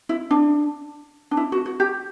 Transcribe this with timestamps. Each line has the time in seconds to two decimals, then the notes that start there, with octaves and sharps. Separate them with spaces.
0.09 E4
0.31 D4
1.31 D4
1.37 E4
1.52 F#4
1.66 F#4
1.80 G4